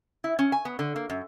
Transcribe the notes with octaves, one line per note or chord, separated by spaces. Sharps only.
E4
C#4
G#5
B3
D3
A#3
F#2